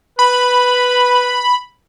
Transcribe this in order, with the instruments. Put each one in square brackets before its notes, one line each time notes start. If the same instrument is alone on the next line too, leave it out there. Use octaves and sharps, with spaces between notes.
[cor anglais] B4 [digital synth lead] B5